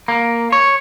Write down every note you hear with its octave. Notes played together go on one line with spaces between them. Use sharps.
A#3
C#5